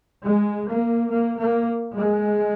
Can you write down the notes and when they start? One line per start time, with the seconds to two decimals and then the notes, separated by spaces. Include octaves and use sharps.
0.24 G#3
0.67 A#3
1.09 A#3
1.37 A#3
1.93 G#3